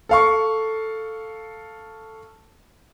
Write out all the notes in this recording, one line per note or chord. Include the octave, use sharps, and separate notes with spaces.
A4 F5 C#6